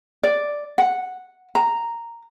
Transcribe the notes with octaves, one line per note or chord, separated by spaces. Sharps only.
D5
F#5
A#5